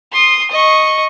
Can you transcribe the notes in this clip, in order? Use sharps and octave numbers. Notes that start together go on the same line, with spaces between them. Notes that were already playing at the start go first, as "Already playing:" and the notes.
C6 D#6
D#5 C#6